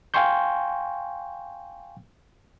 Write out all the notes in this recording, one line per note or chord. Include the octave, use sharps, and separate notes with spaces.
F5 G5 G#5 C6 C#6 G6